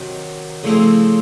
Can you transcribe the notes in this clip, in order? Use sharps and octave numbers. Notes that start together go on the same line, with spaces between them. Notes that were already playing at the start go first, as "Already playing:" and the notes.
Already playing: C3 D#3 F#3
C#3 F3 A3 C4 E4